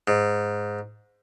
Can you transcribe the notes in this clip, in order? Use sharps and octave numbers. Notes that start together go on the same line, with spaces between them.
G#2